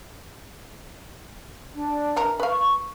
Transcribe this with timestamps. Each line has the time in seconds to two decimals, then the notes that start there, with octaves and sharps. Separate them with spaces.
1.74 D4
2.16 E3 A#4 A#5
2.40 B4 F5 C#6